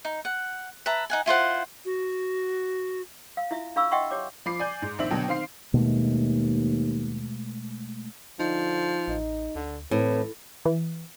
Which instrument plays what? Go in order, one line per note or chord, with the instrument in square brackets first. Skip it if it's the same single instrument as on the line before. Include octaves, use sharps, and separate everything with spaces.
[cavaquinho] D#4
F#5
B4 E5 A5 A#5
D#4 F#5 G#5
E4 F4 C5 F#5
[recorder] F#4
[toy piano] F5
E4 F4 E5
D4 G#4 F5 B5 C#6 E6
D#5 E5 F#5 G5 C6 C#6
G4 C#5 D6
[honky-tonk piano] F3 B5 D6 C7
D5 G#5 G6
G#2
A#1 D#3 C4 E5 F#7
B2 D3 F#3 G5 A5
D#3 C4 F5 C6 C7
[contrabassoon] D#2 [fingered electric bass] B2 G#3 A3
[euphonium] D3 [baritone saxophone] F3 [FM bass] D#4
[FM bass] A1 [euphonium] D#4
[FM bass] D2 [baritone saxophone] D3
[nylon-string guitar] A2 [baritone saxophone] E3 [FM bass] C4 [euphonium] B4
[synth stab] E3